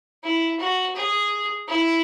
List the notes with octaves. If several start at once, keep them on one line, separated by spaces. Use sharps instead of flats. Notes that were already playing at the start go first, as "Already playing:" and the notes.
E4
F#4
G#4
E4